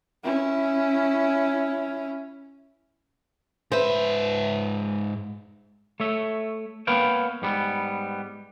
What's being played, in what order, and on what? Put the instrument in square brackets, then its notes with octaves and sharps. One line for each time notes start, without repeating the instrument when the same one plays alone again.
[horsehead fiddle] C#4 E4
[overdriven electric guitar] G#2 E5 [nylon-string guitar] B4 C5
[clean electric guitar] A3 C#5 E5
A#3 B3 B4 C#5 F5 G5
G#2 G3 B3